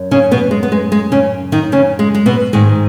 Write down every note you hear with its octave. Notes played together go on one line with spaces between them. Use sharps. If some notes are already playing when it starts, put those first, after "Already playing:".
Already playing: F#2
C#3 C#4
B2 B3
G#3
B3
G#3
G#3
C#3 C#4
D#3 D#4
C#3 C#4
G#3
G#3
B2 B3
G#2 D#3 G#3